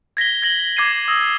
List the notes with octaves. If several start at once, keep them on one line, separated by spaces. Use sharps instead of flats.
G#6 A#6 B6 G7
G#6 A#6 F#7 G7
D6 G#6 C7 D#7
D#6 E6 A#6